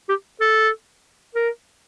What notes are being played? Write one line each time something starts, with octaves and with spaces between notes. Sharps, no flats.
G4
A4
A#4